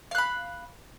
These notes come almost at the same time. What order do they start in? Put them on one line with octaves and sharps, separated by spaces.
F5 F#6 B5